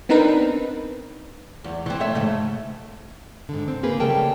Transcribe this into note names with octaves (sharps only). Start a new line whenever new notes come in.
B3 C4 D4 D#4 A#4 B4
E2
E3 C4
A3 C#5 E5
G#2 C#3 A3
G#2 D3
C4
A#3 G#4 B4
C#3 G3 A3 A#4 G5 A5